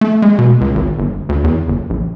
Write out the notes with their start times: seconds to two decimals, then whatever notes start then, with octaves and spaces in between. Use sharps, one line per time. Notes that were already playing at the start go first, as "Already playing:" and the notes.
0.01 A3
0.22 G#3
0.39 B2
0.61 C#2
0.75 G#1
0.99 G1
1.29 D2
1.44 E2
1.68 G1
1.90 A#1